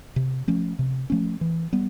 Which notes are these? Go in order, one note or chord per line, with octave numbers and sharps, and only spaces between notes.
C3
F3 A3 C#4
C3
F3 A3 C#4
E3
G3 B3